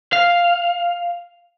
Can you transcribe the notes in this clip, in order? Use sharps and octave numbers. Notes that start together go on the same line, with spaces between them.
F5